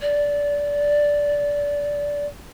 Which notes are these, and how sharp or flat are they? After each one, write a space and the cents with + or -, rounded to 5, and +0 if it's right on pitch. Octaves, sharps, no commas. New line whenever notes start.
D5 -20